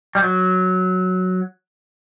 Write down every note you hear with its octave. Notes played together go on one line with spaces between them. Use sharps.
G3
F#3